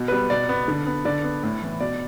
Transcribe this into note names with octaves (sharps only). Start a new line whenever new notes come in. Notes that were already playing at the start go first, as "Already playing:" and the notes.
Already playing: B2
G3 B3 B4
B2 D5
B3
D3
B3
D3 D5
B3
A2
E3 B3
B2 D5